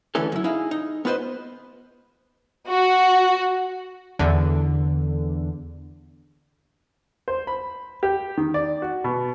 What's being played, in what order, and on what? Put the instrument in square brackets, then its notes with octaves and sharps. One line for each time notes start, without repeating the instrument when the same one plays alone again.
[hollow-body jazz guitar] D3 E3 A3 C#4 A4
F#2 E4
D#4 E4 G#4 F5
D#4
B3 F4 B4 C5 D#5
[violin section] F#4
[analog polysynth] E2 D3
[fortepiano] C5
B5
G4
D#3
D5
F#4
B2